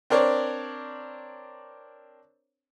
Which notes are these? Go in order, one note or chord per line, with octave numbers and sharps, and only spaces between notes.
C4 D4 A#4 C#5 D5